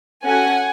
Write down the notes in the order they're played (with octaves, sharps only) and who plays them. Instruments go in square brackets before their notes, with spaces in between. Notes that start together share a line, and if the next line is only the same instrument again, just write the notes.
[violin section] C#4 F#4 A4 F#5 G#5